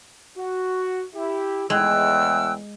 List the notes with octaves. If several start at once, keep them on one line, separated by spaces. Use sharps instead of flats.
F#4
E4 G4
E2 A2 G#3 G5 E6 F#6